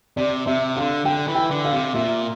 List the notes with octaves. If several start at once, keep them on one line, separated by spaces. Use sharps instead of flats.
C3 D5
C3 E5
D3 F5
D3 G5
E3
G5
D3
F5
C3
A#2 E5